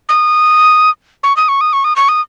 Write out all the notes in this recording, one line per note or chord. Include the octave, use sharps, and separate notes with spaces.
D#6
C#6
D#6
C#6
D#6
C#6
D#6
C#6
D#6